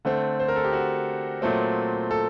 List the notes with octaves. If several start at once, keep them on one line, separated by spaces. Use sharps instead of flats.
D3 A3 C4
C5
A#4
A4
G4
F#4
A#2 F#3 A3 C4
A4